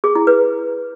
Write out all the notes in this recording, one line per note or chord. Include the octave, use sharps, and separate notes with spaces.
G#4
E4
B4